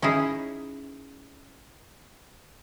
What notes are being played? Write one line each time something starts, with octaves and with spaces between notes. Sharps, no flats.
C#4 D#4 E4 G#4